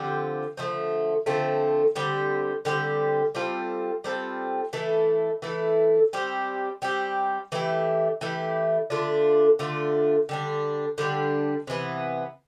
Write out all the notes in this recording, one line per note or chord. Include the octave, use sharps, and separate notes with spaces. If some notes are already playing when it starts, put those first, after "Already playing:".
Already playing: D3 F3 C4 G4
D3 F3 A3 C4
D3 F3 A3 C4
D3 G3 C4 G4
D3 G3 C4 G4
G3 C4 F4 A4
G3 C4 F4 A4
E3 A3 E4 A4
E3 A3 E4 A4
G3 C4 G4
G3 C4 G4
E3 A3 E4 G4
E3 A3 E4 G4
D3 A3 D4 F4
D3 A3 D4 F4
D3 G3 D4
D3 G3 D4
C3 E3 B3